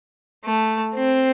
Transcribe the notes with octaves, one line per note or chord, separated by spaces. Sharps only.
A3
C4